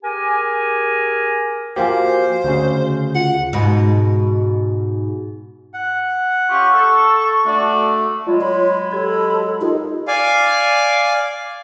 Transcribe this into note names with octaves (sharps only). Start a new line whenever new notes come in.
G4 G#4 A#4 G#5
F3 A#3 F#4 G4 C5 F5 G#5
D2 C#3
F4 F#5
G#2 B2
F#5
C#4 F4 G4 C#6
A4
A3 D4 F#4 D5
F#3 G#3 F4 D5 B5
C#5 B5 C6
G4 A4 G#6
D#4 F4 G4 A#4 D#5
D5 F5 G#5